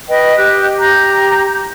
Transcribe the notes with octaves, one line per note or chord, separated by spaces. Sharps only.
B4 D#5 G5
G4 F#6
G4 A#5 G6